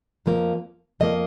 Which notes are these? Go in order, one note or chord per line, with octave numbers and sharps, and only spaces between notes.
F2 F3 A#3
F2 F3 A#3 D#5